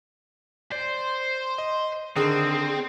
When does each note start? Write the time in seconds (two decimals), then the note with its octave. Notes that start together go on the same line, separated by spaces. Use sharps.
0.72 C5 D5
1.58 D#5
2.16 D3 D#3 C4 G#4 D#6